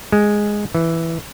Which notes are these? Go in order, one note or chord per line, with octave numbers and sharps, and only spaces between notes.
G#3
E3